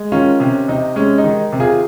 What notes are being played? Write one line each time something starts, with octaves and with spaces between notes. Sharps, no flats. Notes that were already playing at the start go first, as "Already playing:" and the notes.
Already playing: G#3
D#3 C#4 F4
C3 C#4
C3 D#4
G#3 C#4
D#4
D#3
C3
F4 G#4